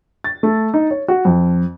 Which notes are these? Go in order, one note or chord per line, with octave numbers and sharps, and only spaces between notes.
A6
A3
D#4
C#5
F#4
F2